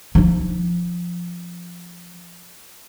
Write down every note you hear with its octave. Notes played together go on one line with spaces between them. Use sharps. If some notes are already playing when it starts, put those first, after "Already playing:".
F3 D#4